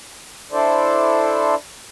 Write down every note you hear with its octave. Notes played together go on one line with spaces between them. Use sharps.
D4 E4 A4 C5 D5